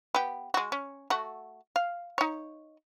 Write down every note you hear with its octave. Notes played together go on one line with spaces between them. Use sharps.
B3 G4
G#3 F#4
C#4
A3 F#4
F5
D#4 C#5